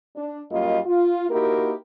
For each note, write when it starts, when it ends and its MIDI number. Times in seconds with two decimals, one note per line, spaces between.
0.16 0.39 62
0.51 0.79 42
0.51 0.79 55
0.51 0.79 58
0.51 0.79 65
0.51 0.79 75
0.86 1.27 65
1.30 1.72 58
1.30 1.72 63
1.30 1.72 64
1.30 1.72 66
1.30 1.72 67
1.30 1.72 70